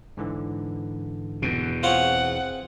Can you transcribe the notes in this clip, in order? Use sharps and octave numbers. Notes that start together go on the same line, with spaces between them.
G#2 D3 E3
E2 B2
C4 F4 G#4 C5 C#5 F#5